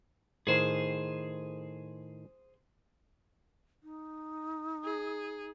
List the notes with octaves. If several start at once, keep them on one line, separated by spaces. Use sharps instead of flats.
A2 D#3 G#4 C5
D#4
G#4